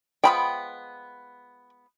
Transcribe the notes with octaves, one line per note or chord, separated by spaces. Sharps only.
F3 G#3 B3 G5 B5